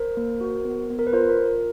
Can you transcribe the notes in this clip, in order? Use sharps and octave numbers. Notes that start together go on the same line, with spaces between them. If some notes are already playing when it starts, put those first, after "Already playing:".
Already playing: A#4 C5
A#3
F#4
B3
B3
A#4
B4
F4 A#4 C5
A#4
F4
A#4